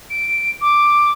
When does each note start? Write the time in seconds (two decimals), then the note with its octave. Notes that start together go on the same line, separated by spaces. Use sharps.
0.10 D7
0.61 D6